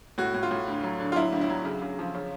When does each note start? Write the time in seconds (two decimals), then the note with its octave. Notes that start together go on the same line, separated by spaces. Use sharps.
0.18 A2 F#4
0.34 A2
0.43 F4
0.51 A2
0.68 D2
0.83 F#3
1.00 D3
1.12 F4
1.16 F#3 E4
1.32 D2
1.41 E4
1.49 F#3
1.65 C#3
1.82 C#3
1.99 F3
2.15 C#3